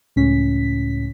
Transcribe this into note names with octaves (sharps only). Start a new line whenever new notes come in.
C#2 A2 C#4 B6